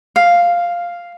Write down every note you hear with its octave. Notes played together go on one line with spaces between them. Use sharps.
F5